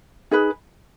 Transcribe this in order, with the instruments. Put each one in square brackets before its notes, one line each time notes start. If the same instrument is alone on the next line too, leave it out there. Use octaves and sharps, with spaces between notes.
[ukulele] D#4 G#4 B4